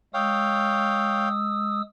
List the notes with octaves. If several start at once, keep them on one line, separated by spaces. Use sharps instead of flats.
G#3 C#5 F5 G5 D#6 E6